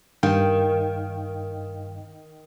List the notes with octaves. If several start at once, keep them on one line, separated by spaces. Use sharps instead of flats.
G2 D#3 F5 G5